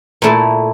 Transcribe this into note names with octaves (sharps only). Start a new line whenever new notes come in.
A#2 A3 E4 A4